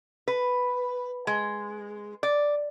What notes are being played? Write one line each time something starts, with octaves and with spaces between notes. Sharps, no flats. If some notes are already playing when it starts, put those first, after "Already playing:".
B4
G#3
D5